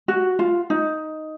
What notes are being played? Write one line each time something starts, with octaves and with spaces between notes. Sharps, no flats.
F#4
F4
D#4